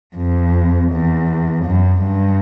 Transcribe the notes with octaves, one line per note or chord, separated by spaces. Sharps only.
F2
E2
F#2
G2